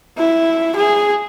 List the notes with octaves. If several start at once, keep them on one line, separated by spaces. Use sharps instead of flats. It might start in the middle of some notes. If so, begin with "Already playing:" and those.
E4
G#4